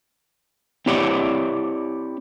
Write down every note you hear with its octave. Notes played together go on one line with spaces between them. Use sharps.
C4 E4 G4 C#5 D5 F#5